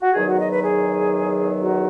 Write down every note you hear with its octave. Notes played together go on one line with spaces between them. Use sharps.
F#4
E2 D#3 F#3 G#4
F#4
D#5
B4
G#4
F#4